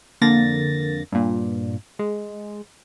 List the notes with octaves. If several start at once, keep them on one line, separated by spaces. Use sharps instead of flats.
F2 D3 A#3 A6 A#6
G2 A#2
G#3